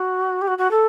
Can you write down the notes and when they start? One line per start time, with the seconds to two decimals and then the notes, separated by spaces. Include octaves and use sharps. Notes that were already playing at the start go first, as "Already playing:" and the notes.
Already playing: F#4
0.41 G4
0.47 F#4
0.58 F#4
0.71 A4